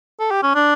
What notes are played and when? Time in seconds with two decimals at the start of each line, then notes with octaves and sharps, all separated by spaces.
0.20 A4
0.31 G4
0.43 C#4
0.55 D4